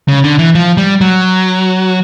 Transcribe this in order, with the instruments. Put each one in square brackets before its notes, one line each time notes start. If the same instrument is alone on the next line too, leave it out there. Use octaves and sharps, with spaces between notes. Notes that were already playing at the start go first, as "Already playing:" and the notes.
[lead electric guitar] C#3
D3
E3
F3
G3
F#3